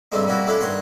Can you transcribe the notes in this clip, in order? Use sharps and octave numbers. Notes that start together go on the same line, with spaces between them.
G2 C#3 G3 A3 C4 D#4
G3 A#3 C#4 E4 F#4
A3 C#4 D4 E4 A4
G2 D#3 C#5 F#5 C6